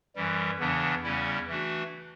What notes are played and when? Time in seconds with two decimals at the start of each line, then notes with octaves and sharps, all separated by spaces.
0.16 F#2 E3 G3
0.59 E2 C#3 E3 B3 D4
1.03 E2 C#3 G3 C#4 E4
1.47 E3 A3 D4 F#4